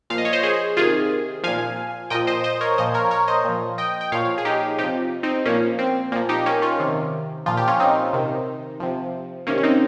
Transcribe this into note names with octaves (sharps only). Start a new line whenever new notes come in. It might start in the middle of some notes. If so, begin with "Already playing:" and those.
A#2 F3 F5
D#5
C#5
C5 D#5
G#4 C5
C3 D#3 F4 G#4
A#2 F3 F5 G#5
A#2 F3 D#5 G5
C5 D#5
C5 D#5
A#4 C#5
A#2 F3 C5 D#5
A#4 C#5
A#4 C#5
C5 D#5
A#2 F3
D#5 G5
G5
A#2 F3 C#5 F5
G#4
D#4 G4
C3 F3 D#4 G4
C4 D#4
A#2 F3 A#3 C#4
C4
A#2 F3 A#3
D#4 G4
A#3 C#4
C#4 F4
C3 D#3
A#2 F3 F4
G4
C#4 F4
C4 D#4
C3 D#3
C3 F3
C3 D#3 A#3 C#4
C#4
C4 D#4